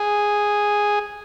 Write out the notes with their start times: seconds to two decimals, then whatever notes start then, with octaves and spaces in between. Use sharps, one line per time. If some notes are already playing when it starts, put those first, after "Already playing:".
Already playing: G#4